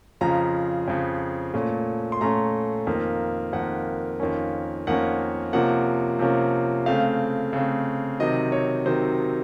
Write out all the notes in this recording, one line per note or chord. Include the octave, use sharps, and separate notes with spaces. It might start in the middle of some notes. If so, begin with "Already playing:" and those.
F2 C#3 F3 A#5
F2 C#3 F3
A#2 A3 C#4
C6
A#2 A3 C#4 A#5
F2 D#3 A#3
F2 D#3 A#3 F#5
F2 D#3 A#3 C#4
F2 D#3 A#3 C#4 F#5
C3 F3 A#3 C#4 F#5
C3 F3 A#3 C#4
C#3 A3 C4 F5
C#3 A3 C4
C3 D#3 F#3 C4 D#5
C#5
C3 D#3 F#3 C4 C5